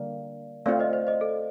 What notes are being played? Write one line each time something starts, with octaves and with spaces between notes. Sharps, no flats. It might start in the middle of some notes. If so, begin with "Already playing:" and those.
Already playing: D3 G3 A#3 D5 F5
A3 C4 F4 D5 F5
C5 D#5
C5
C5 D#5
A4